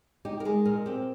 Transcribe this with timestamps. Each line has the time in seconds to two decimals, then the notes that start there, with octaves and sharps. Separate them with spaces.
0.25 D#4 G4
0.40 A#4
0.45 G#3 G#4
0.66 A#2 A#4
0.86 C4 G4